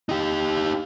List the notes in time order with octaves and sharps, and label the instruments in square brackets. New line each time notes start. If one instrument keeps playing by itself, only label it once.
[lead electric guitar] D#4 G4